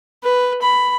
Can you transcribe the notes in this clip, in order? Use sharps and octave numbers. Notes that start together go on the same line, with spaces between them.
B4
B5